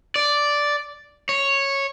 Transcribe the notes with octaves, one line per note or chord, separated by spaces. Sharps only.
D5
C#5